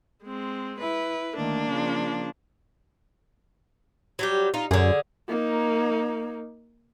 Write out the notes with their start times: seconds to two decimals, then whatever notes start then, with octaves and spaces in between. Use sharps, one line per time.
0.23 G#3 C4
0.80 E4 B4
1.36 D2 D#3 A#3 D4
1.70 C#3 F3
4.19 F#3 G3 G4
4.54 D#4 F4
4.71 F#2 D3 G#4
5.28 A#3 D#4